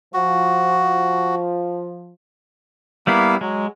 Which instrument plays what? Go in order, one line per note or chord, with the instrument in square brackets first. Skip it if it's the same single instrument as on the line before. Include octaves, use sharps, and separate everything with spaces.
[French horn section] F3 [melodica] F#4
[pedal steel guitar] G3 B3 E4 [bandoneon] A#3 F5
[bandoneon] F#3 [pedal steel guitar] G#3